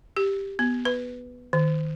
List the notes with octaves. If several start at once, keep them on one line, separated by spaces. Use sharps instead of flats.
G4
B3
B4
D#3